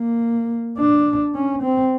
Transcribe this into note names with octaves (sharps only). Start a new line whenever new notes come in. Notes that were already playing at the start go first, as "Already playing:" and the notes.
Already playing: A#3
D4
C#4
C4